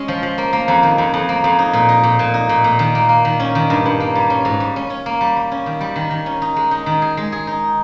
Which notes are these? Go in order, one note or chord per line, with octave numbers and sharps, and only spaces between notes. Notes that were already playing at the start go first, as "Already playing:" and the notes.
Already playing: G#3 C#4
F3
F3
A#3
A#3
F2
D#3
F2
F2
A#3
F2
D#4
A#2
D#4
A#2
A#2
D#4
A#2
A#2
D#3
A#3
A#3
D#3
C#4
D#3
G2
G2
A#3
G3
C#4
G#2
G3
C#4
C#4
A#3
G3
G3
C#4
D#3
G3
D#3
D#3
C#4
D#4
G#3
D#4
D#3
G#4
G#3
G#4
D#4